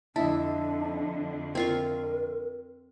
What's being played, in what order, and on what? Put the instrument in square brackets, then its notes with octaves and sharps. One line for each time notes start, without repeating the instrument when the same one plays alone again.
[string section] F2 D3 [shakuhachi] D4 [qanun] E4 [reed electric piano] D#5 E5 A5
[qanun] C4 F4 C#6 [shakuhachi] A#4